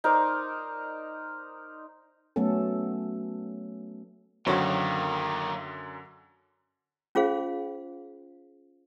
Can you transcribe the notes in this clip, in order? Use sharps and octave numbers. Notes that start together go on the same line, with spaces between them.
D#4 A#4 C5 D5
F#3 A3 B3 C#4 A4
F#2 D3 D#3 F#3 A#3 C4 F#4 C#5
C#4 F4 G#4 C5 F5